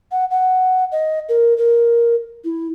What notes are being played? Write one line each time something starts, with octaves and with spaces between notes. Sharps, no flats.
F#5
F#5
D#5
A#4
A#4
E4